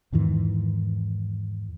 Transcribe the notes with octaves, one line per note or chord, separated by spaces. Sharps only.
E2 G#2 D#3 E3